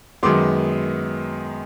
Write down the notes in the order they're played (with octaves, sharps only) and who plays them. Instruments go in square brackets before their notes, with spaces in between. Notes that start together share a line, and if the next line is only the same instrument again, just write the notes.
[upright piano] F#2 D#3 G#3 B3 C6 D6